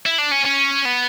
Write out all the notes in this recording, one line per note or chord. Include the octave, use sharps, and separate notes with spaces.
E4
D4
C#4
C#4
B3